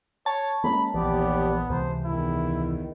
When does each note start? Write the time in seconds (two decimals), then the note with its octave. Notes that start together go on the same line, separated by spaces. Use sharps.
0.26 C#5 A5
0.64 G#3 A#3 C#4 B5
0.94 A#1 D#2 E3 B3 G4 D5
1.69 C#2 C3 E3 C5
2.05 E2 D#3 E4